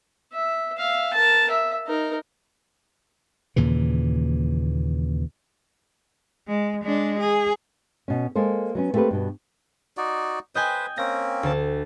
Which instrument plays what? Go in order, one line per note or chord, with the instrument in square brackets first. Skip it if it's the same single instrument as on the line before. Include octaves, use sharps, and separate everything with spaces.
[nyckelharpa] E5
E5 F5
A#4 A5
E5
D#4 A#4
[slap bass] D#2 A#2 C#3 E3
[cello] G#3
G#3 D4
G#4
[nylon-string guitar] B2 C#4
G#3 A#3 A4 C5
F#3 B3 C#4
A3 A#3 C4 G4 A4 B4
G2 B2
[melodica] D#4 F#4 D5
[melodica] B4 C5 [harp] D#5 G5 G#5
[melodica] A#3 C4 C#4 [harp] A#6
[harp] D2 A5